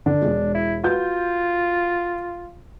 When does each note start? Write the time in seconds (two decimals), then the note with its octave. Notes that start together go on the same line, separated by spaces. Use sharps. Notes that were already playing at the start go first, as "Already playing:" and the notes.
0.06 D3 D4
0.22 E1 G#3
0.55 E4
0.84 F4 F#4 B4 G6